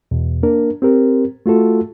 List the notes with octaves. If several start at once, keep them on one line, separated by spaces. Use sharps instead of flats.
E2 B2
A#3 D4 A#4
C4 G4 A#4
A3 F4 F#4 A4